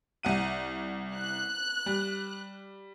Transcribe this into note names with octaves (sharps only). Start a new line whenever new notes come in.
C2 F#5 D#7
F#6
G3